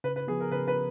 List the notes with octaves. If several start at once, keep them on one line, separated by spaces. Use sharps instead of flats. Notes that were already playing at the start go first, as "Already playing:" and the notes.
C#3 B4
B4
F3 B3 G#4
A#4
C#3 B4
B4